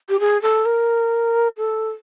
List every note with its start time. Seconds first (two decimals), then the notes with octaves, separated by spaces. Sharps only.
0.09 G4
0.20 G#4
0.42 A4
0.65 A#4
1.58 A4